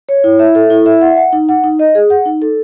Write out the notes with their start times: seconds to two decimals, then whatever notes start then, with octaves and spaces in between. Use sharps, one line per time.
0.09 C#5
0.24 E4
0.39 E5
0.55 A4
0.70 E4
0.86 E5
1.01 F#5
1.17 F#5
1.33 D#4
1.49 F#5
1.64 D#4
1.79 D#5
1.95 G#4
2.10 F#5
2.26 D#4
2.42 A4